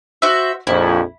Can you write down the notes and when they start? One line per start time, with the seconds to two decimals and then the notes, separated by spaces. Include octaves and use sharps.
0.22 F#4 C5 E5
0.67 A#1 F2 E4